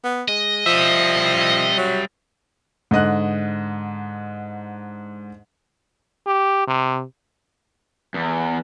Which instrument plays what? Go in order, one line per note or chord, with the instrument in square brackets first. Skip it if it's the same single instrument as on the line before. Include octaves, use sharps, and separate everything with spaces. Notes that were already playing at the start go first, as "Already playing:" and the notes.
[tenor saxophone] B3
[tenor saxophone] G#3 [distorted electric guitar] D#5
[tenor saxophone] F3 [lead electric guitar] G3 E5
[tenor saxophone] F#3
[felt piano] G#2 D3 D#5 F#6
[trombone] G4
C3
[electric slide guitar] E2